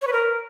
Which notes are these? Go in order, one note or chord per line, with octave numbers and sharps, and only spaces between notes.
C#5
B4
A#4